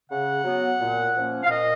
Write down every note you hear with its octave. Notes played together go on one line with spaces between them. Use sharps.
C#3 F#5
F#3 B3
A#2
F3 A#3 C#4
F5
A#2 D#5